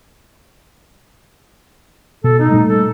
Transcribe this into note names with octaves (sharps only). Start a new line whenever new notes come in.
B2 A4
D#4
A#2 G3 A3
A4